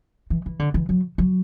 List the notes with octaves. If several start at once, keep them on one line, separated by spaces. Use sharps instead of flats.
E3
E3
D3
E3
F#3
F#3